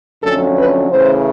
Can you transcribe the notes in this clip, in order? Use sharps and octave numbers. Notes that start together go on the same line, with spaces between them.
F2 D3 F#3 A3 C#4 A4
B4
C#3 E3 A3 C#4 C5